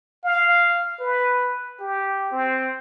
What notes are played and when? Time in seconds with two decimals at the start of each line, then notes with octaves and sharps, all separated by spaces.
0.24 F5
1.00 B4
1.80 G4
2.32 C4